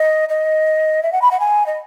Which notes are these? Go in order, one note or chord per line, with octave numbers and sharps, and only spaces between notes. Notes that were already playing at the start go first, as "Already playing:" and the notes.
Already playing: D#5
D#5
E5
F#5
B5
F#5
G#5
D#5